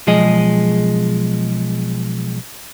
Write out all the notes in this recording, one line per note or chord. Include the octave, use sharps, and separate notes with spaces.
B1 F3 G#3 G#4 D#5